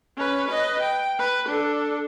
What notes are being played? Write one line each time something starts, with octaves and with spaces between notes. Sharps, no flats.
C#4 B4
B4 D#5
G5
B4
D4 A4